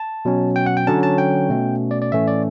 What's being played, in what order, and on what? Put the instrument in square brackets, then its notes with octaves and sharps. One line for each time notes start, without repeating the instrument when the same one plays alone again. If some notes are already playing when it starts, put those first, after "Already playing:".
Already playing: [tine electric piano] A5
B2 F#3 C#4
G5
F#5
G5
D3 F#3 C#4 A5
A5
G5
B2 A3 C#4
D5
D5
A2 E3 A3 C#4 E5
D5